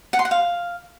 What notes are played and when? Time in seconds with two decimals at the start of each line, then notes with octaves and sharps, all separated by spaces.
0.13 F#5
0.19 C6
0.25 F#5
0.31 F5